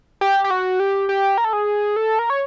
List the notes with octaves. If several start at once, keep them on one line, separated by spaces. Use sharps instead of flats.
G4
G4
F#4
G4
G4
A#4
A4
G#4
A4
A#4
C#5